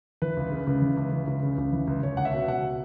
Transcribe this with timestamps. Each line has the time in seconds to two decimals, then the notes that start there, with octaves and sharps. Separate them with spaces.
0.22 E3 B4
0.37 C#2
0.51 C#3
0.67 C#2
0.82 E3
0.97 C#2
1.12 E3
1.27 C#2
1.43 C#3
1.58 C#2
1.73 E3
1.87 C#2
2.03 C#2 C#5
2.17 C#2 F#5
2.25 E5
2.33 B2
2.48 B2 F#5